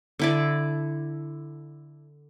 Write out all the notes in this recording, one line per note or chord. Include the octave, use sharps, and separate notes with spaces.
D3 E4 D5